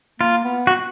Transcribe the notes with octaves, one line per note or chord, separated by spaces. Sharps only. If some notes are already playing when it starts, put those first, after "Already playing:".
A#3 F4
B3
F#4